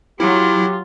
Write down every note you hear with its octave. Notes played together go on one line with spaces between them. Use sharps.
F#3 E4 F4 G4